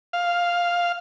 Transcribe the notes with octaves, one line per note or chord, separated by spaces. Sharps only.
F5